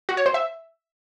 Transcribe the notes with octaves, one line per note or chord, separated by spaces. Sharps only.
F#4
C#5
C5
E5